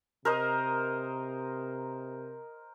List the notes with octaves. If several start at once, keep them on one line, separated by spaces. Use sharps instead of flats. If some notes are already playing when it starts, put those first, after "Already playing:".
C3 A#4 C5 D#5